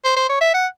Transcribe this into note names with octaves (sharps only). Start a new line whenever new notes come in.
C5
C5
C#5
E5
F#5